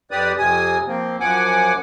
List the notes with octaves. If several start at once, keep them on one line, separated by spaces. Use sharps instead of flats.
F2 G4 B4 D5 D#6
F2 C3 G#5 D#6
F3 A#3 C4
F#2 F3 F#5 G#5 D6